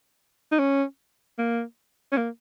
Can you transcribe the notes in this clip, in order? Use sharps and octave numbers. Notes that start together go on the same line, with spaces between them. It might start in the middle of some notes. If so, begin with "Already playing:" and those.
D#4
C#4
A#3
C#4
A#3